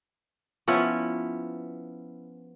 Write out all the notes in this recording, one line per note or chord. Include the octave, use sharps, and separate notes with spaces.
F3 B3 C#4 E4